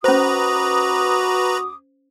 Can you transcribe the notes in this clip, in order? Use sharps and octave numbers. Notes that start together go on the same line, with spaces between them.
D#2 C#4 F#4 B4 C5 A#5 D6 D#6